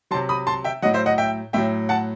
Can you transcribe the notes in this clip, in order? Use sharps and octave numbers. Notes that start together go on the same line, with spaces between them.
C3 F#3 A5 C6
B5 D#6
A5 C6
E5 G5
A2 F#3 D#5 F#5
C5 E5
D#5 F#5
E5 G5
A2 F#3 E5 G5
F#5 A5